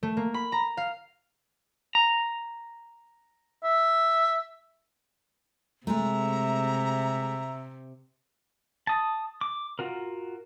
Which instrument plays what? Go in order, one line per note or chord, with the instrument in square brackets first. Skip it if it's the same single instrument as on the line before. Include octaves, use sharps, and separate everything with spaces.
[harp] A3
A#3
B5
A#5
F5
[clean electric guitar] A#5
[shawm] E5
[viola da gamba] C3 [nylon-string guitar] G#3 A3 [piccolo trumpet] E5 [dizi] A#5
[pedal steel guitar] A5 D#6
D6
F4 F#4 A#4